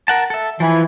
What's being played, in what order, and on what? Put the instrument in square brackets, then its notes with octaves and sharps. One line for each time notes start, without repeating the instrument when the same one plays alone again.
[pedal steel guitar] A#4 F#5 A5
A4 E5
[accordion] E3 [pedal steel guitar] F3 E4